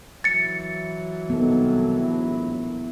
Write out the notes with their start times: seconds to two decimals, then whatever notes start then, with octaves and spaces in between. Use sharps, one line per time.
0.24 E3 F#3 A6 C#7
1.30 C2 D#3 B3 A4
2.00 A#1 A2 E4